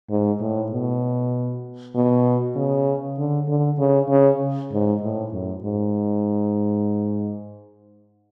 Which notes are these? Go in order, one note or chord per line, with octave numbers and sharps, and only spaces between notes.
G#2
A2
B2
B2
C#3
D3
D3
C#3
C#3
G#2
A2
F#2
G#2